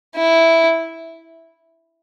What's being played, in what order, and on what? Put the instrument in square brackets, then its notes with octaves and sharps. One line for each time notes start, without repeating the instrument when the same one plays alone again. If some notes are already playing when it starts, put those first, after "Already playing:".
[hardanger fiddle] E4